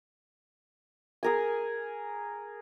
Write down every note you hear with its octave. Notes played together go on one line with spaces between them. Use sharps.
G#4 A#4 G#5